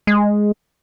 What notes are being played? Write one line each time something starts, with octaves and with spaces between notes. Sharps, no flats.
G#3